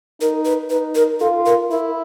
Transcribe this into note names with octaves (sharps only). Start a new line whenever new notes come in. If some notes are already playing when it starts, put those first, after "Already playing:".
D#4 A#4
B4
D#4 B4
A#4
F4 A4
A#4
E4 A#4